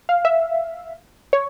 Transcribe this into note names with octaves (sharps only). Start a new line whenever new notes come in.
F5
E5
C#5